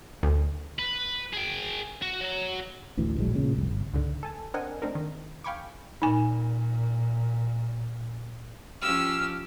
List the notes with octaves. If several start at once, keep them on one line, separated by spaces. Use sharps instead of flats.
D2
B4
G#4 G5
F#4
F#3
A1 D2 E3
D1 A#1 F#3 G#3
E2 A#2 C#3
F1 C2
G1
C#2 G#2 D3
A4 G#5 A5
C4 D4 A#4 D#5 F#5 G#5
A3 C4 D4 D#4 A#4
D#3
F5 G5 G#5 B5 C#6 D6
A#2 D#4 G#5
F3 C#4 G4 E6 F6